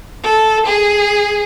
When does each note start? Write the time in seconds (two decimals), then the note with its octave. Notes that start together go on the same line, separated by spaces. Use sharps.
0.23 A4
0.67 G#4